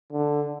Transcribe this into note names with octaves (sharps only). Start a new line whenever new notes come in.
D3